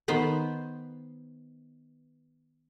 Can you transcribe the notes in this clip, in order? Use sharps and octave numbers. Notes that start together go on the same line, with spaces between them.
D#3 B3 B4 C5